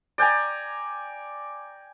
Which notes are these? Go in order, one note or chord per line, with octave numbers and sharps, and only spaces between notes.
D5 G5 G#5 A#5